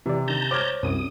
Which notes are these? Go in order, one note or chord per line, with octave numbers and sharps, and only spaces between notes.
C3 E3 D5
D3 D#3 A5 A#5 G6
C5 C#5 D6 F6 G#6
C2 F#2 D#6